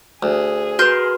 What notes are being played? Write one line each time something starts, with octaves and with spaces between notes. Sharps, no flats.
D2 G#4
F#4 A#4 B4 C6 G6